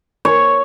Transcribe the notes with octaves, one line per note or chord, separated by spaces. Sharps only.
C#5